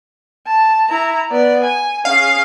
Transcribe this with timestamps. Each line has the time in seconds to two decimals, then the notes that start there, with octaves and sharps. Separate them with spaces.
0.47 A5
0.90 E4 A#5
1.31 B3 D5
1.64 G#5
2.05 C#4 G#4 F5